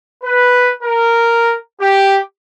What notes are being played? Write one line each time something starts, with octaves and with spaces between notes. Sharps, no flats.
B4
A#4
G4